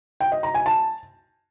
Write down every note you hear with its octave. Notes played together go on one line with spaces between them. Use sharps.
G5
D#5
A#5
G#5
A5